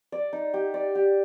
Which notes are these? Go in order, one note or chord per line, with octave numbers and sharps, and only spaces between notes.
D5
D#4
G4
D5
G4